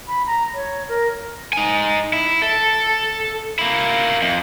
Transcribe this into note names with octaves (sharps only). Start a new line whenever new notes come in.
B5
A#5
C#5
A#4
D#4 G#5
E4
A4
A#3 E4
F2